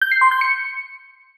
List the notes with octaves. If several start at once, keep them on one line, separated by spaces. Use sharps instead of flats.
G6
C7
C6
G6
C#7